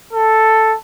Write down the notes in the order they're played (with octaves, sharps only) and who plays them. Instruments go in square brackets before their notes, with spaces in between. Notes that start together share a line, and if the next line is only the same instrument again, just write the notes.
[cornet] A4